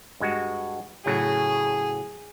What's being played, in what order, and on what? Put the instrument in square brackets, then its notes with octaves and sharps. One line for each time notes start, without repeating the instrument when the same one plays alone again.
[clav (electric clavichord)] G2 G#3 F#4
[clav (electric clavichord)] A2 C#3 F#3 [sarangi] G#4